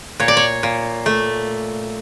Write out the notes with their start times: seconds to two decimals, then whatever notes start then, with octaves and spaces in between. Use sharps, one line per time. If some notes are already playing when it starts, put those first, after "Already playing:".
0.20 A#2 C#5
0.28 D5
0.37 C#5
0.63 A#2
1.06 A3